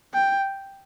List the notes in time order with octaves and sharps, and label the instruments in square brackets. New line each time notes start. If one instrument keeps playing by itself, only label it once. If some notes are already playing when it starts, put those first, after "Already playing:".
[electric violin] G5